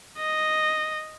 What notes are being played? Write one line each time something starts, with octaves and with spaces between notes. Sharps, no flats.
D#5